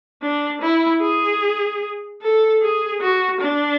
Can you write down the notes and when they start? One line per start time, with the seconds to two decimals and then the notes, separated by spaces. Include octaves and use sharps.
0.22 D4
0.62 E4
1.01 G#4
2.22 A4
2.62 G#4
3.01 F#4
3.41 D4